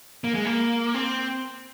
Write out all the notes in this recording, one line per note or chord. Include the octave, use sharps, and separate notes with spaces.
A#3
G#3
A#3
C4